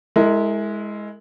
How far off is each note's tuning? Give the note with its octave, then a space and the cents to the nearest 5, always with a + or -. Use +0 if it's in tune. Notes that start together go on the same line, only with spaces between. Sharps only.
G#3 +5 E4 -15 A#4 -35